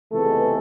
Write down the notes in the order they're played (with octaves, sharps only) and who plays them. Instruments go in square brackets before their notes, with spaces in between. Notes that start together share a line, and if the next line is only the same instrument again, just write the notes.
[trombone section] C#2 C3 E3 G#3 A3 B3 A4